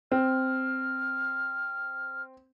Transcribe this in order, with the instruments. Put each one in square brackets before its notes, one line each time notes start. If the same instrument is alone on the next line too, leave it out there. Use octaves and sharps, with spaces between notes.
[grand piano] C4 [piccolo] F6